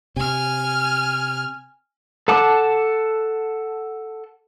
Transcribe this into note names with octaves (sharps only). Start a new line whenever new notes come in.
C3 G#5 F6
A4 F#5 A5 D6